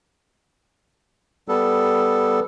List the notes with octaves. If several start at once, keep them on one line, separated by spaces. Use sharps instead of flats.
G3 B3 A4